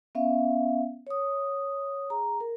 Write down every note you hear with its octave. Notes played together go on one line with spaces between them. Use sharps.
B3 C#4 E5 F5
C#5 D#6
G#4 A#5
A#4